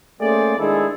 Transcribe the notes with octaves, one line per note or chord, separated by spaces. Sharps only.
A3 A#3 C#4 G#4 C5 D5
D#3 G#3 D4 E4 G#4 A4